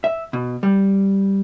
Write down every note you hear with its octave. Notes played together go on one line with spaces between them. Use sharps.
E5
B2
G3